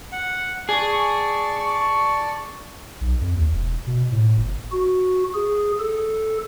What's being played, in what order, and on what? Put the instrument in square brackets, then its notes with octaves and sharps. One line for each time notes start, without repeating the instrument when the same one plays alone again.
[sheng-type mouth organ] F#5
[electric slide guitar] G#4 [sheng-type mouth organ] D5 A5 [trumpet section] C#6
[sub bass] B1
F2
D#2
E1
B2
A2
G1
[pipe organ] F#4
G#4
A4